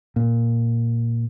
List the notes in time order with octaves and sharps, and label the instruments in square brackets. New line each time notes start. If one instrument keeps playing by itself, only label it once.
[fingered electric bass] A#2